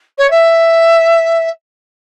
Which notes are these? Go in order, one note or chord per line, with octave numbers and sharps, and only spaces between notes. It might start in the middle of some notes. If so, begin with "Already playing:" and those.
C#5
E5